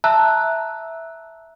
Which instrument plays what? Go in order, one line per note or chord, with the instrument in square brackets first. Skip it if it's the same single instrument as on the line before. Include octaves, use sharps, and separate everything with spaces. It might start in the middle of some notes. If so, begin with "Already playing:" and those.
[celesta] E5 A5 A#5 E6 F#6